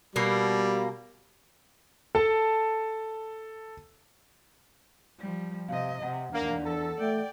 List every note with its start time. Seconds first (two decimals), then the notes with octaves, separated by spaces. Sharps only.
0.16 B2 G3 A#3
2.15 A4 A5
5.19 F3 G3
5.68 C3 D#5 F5
6.03 C3 F#5
6.33 E2 A#3 D4
6.65 A4
7.00 A3 D5 G5